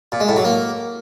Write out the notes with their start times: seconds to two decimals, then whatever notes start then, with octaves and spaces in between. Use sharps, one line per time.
0.12 A#2
0.20 G#3
0.28 A2
0.36 F#3
0.45 A#3